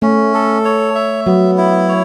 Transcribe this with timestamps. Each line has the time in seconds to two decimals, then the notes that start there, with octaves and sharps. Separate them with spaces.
0.02 A3 C#4
0.34 A4
0.65 C#5
0.95 E5
1.26 F#3 B3
1.58 E4
1.88 C#5